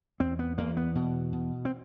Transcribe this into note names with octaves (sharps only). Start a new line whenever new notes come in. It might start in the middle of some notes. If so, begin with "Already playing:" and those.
E2 C4
B3
E2 A#3
B3
B2
B2
C4